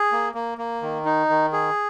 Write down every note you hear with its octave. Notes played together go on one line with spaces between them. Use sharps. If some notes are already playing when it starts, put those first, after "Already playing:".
Already playing: G#4
A#3
A#3
A#3
D#3
D#4
D#3
G#4